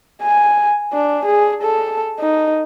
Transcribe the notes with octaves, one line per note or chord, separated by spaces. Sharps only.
G#5
D4
G#4
A4
D#4